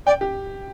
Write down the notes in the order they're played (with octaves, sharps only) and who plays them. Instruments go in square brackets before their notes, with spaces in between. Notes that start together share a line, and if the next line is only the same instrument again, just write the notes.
[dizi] D5 [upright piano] G5
[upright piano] G4